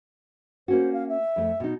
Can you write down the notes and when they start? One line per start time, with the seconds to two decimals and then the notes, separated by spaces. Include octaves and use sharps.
0.68 A#3 C#4 F#4 C5
0.93 F5
1.08 E5
1.36 F2 A3
1.60 B2 D#4